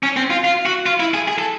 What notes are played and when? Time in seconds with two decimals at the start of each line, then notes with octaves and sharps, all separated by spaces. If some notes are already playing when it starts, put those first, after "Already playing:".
0.03 C#4
0.16 C4
0.30 F4
0.44 F4
0.66 F#4
0.86 F4
1.00 E4
1.14 G#4
1.28 G#4
1.38 A4